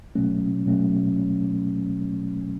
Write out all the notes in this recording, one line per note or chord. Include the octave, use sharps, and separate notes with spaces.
B2 F#3 A3 C#4
B2 F#3 A3 C#4